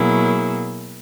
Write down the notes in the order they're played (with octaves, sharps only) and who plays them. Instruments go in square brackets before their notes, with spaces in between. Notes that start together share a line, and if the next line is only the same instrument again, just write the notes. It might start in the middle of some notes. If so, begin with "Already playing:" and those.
Already playing: [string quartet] B2 F#3 A#3 E4 G#4